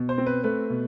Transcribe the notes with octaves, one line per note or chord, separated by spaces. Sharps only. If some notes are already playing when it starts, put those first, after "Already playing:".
Already playing: B2
C5
C4
B4
A3 B4
B2